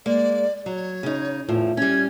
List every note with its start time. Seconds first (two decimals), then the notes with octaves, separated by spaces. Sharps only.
0.06 G#3 A#3 D5
0.66 F#3 C#5
1.03 C#3 D#4
1.49 E2 A2 F3
1.77 G3 C#4 G#6